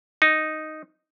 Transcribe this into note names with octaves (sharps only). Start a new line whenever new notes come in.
D#4